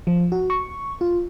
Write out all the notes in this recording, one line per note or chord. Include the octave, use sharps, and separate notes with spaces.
F3
F#4
C#6
F4